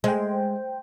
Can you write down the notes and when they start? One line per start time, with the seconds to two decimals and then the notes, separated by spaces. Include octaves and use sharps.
0.04 G#3 C5 G5